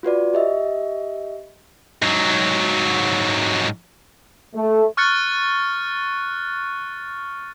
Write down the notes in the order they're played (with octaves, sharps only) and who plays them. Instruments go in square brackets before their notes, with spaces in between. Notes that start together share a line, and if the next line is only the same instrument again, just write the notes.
[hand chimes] F4 F#4 B4 D5
G4 D#5 E5
[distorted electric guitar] G#2 F#3
[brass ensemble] A3
[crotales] C#6 F6 F#6 A6 C#7